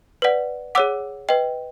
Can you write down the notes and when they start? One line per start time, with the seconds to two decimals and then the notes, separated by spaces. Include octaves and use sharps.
0.22 B4 D5 F#5
0.75 G#4 C#5 F#5 D6 E6
1.29 B4 D#5 G5